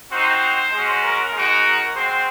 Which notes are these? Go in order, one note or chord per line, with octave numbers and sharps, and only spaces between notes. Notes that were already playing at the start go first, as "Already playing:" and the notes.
C4 D#4 F#4 C5
G#3 C#4 F#4
A#4
G#3 D#4 F#4
G#3 C4 F#4 C5